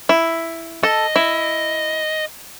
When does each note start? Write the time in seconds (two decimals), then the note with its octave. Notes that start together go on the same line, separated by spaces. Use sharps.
0.09 E4
0.83 A4 D#5
1.16 E4